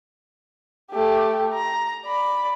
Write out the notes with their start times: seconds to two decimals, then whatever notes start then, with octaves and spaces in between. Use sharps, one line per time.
0.91 A3 G4
1.54 A#5
2.05 D5 B5